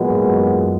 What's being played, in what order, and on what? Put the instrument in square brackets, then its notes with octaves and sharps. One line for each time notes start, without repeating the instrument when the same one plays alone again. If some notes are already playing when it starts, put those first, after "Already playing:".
Already playing: [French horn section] A#2 G#3 B3 F#4 [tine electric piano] E3 F#3
[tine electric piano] G#2
F#2